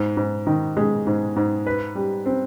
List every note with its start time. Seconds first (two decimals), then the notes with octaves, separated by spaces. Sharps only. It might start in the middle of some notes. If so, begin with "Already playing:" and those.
Already playing: G#2
0.17 G#2
0.47 D#3
0.77 G#3
1.07 G#2
1.36 G#2
1.66 B4
1.95 G3
2.26 C4